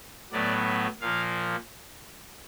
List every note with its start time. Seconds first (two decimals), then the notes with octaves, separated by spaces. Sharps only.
0.32 A2 F#3 B3 D5
1.00 A#2 F3 A#3 F5